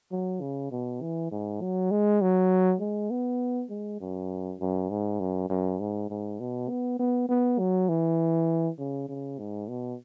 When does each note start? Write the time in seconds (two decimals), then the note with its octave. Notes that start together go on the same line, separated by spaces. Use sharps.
0.11 F#3
0.41 C#3
0.71 B2
1.01 E3
1.32 G#2
1.61 F#3
1.91 G#3
2.21 F#3
2.81 G#3
3.11 B3
3.70 G#3
4.00 F#2
4.60 F#2
4.90 G#2
5.20 F#2
5.50 F#2
5.80 G#2
6.10 G#2
6.40 B2
6.69 B3
6.99 B3
7.29 B3
7.59 F#3
7.89 E3
8.79 C#3
9.09 C#3
9.39 G#2
9.68 B2